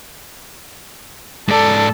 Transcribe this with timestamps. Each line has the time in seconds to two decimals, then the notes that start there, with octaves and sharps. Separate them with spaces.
1.48 G#2 A4 D5